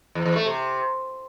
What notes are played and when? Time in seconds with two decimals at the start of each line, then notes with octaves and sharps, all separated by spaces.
0.15 E2
0.26 E2
0.36 A3
0.46 C3